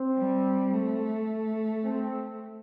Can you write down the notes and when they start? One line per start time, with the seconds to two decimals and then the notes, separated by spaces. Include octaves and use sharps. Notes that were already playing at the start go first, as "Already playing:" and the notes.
Already playing: C4
0.17 G3
0.74 A3
1.84 C4